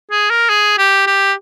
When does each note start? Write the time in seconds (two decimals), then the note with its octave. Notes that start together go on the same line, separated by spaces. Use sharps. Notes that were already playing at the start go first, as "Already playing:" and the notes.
0.11 G#4
0.30 A#4
0.49 G#4
0.78 G4
1.07 G4